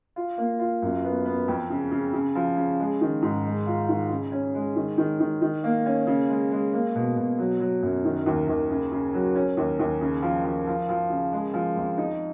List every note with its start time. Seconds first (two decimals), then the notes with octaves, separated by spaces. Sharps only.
0.16 F4
0.38 A#3
0.60 F4
0.82 F#2
1.04 B3
1.25 B3
1.48 F2
1.70 C#3
1.91 C#3
2.13 C#3
2.35 F3
2.57 C#3
2.80 G#3
3.01 D#3
3.22 G#2
3.45 G#3
3.67 F4
3.89 D#3
4.10 C#3
4.32 C#4
4.55 G#3
4.76 D#3
4.98 D#3
5.20 D#3
5.42 D#3
5.64 A#3
5.86 C#4
6.07 C#3
6.29 G#3
6.52 G#3
6.73 A#3
6.95 B2
7.17 B2
7.39 F#3
7.60 F#3
7.82 F#2
8.05 D#3
8.26 D#2
8.48 D#2
8.70 C#3
8.92 C#3
9.14 F#3
9.36 C#4
9.57 D#2
9.79 D#2
10.01 C#3
10.22 F3
10.44 F3
10.67 F3
10.89 F3
11.10 C#3
11.32 G#3
11.54 F3
11.76 F2
11.98 D#4